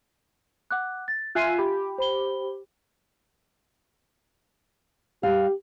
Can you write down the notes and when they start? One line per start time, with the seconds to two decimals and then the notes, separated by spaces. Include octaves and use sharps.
0.71 F#5 D6 F#6
1.08 A6
1.35 F4 E5 G#5 F#6 C7 D#7
1.58 G4 B5
1.98 C5 B5 G7
5.23 G3 G4 F5